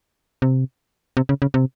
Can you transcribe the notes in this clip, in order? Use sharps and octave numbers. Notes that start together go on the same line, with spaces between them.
C3
C3
C#3
C#3
C3